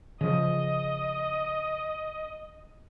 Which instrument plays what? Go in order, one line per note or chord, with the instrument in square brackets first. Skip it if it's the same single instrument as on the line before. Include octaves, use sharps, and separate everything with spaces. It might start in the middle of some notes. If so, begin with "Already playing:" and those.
[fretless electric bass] C#3 F3 [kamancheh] D#5